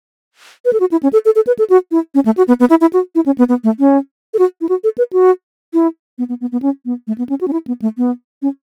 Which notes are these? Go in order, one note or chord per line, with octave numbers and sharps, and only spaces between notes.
B4
A4
F#4
E4
C#4
A4
A4
A4
B4
A4
F#4
E4
C#4
A3
F#4
B3
B3
E4
E4
F#4
E4
C#4
B3
B3
A3
C#4
A4
F#4
E4
F#4
A4
B4
F#4
E4
B3
B3
B3
B3
C#4
B3
A3
B3
C#4
F#4
C#4
E4
B3
A3
B3
C#4